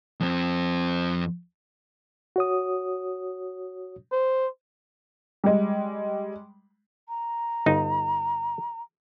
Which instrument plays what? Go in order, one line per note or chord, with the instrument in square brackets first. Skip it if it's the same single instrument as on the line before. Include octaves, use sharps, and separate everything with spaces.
[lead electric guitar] F2 C4
[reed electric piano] F#4 C#5 D#6
[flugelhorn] C5
[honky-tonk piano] G3 G#3
[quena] A#5
[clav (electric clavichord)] G1 D#4